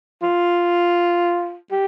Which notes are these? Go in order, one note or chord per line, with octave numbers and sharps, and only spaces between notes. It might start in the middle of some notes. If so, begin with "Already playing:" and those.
F4
G4